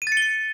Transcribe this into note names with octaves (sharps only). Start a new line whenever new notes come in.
D#7
A6
C#7
G7
C#7